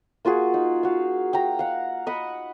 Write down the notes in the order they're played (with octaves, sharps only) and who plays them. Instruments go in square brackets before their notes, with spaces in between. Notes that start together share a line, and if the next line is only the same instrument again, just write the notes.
[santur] A#3 F4 F#4 G#4
D#4
F#4 F5
G5 A#5
F5 F#5
D#5 F#5 B5 C#6